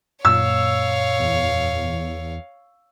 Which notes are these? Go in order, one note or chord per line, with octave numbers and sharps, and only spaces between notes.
F#2 A#2 C#5 F5 E6
E2